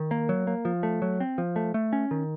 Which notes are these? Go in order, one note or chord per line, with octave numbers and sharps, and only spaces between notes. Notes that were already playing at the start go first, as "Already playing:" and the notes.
Already playing: D#3
A#3
F#3
A#3
F3
A3
F#3
C4
F3
A3
A3
C#4
D#3